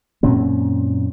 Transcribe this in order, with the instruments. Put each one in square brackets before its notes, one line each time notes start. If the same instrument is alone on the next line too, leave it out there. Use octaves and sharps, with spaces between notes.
[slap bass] F#2 A#2 C4 C#4